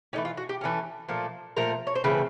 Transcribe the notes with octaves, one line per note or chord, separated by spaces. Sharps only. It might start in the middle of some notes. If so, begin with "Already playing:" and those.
E3 A3 C#4 D#4
F4
F#4
G4
E3 A3 C#4
A#2 F3 A3
A#2 F3 A3 A#4
C#5
C5
C#3 E3 A3 C4 B4